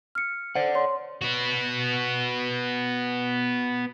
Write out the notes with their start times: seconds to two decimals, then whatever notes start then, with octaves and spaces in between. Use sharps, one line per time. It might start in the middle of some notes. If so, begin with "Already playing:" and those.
0.15 F6 C#7
0.55 C5 D5 F#5
0.75 C#5 C6
1.22 B3 F#4